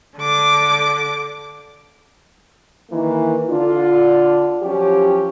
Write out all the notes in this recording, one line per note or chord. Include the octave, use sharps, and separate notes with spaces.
D3 D6
D#3 E3 A#3
D3 D4 F4
F3 F#3 C#4 G4